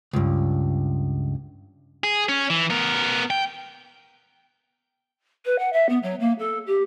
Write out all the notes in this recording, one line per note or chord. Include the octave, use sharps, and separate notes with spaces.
C#2 G2
G#4
C#4
E3
B3 A#4
G5
B4
F#5
E5
B3
F#3
A#3
A4
G4